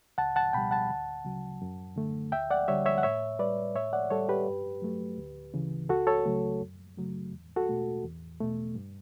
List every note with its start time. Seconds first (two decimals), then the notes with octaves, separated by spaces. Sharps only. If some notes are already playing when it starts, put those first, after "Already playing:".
0.18 C#2 F#5 A5
0.36 F#5 A5
0.53 B2 G3 G5 B5
0.71 F#5 A5
0.90 D2
1.25 C#3 F#3
1.62 F#2
1.96 D3 A3
2.32 D2 E5 G5
2.51 D5 F#5
2.68 D3 G3 C#5 E5
2.86 C#5 E5
2.98 F#5
3.03 A2 C#5 E5
3.39 G3 B4 D5
3.75 A2 C#5 E5
3.93 D5 F#5
4.10 G3 A4 C#5
4.29 G4 B4
4.47 G2
4.82 F#3 A3
5.18 D2
5.54 C#3 E3
5.89 C#2 F#4 A4
6.07 A4 C#5
6.25 C#3 F#3 A3
6.61 F#2
6.97 C#3 F#3 A3
7.32 E2
7.56 F#4 A4
7.69 B2 A3
8.03 E2
8.40 B2 A3
8.75 G2